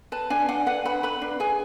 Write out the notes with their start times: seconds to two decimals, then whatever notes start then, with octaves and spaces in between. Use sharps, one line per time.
0.12 B4 A5
0.30 D4 G#5
0.49 D4 F#5
0.66 B4 F#5
0.85 B4 B5
1.03 B4 B5
1.22 D4
1.40 G#4 G#5